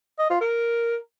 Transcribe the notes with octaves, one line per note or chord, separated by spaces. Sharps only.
D#5
F4
A#4